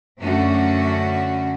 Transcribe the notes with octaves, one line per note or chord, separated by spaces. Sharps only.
F#2 D3 A3 C#4 F#4